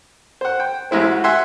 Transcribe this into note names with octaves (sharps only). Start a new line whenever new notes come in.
C5 F#5
G5
A1 G#3 E4 C5
F#4
E5 F#5 G#5 C6